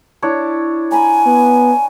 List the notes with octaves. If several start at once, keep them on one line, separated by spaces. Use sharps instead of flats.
D4 E4 C#5
G#5 A#5 B5
B3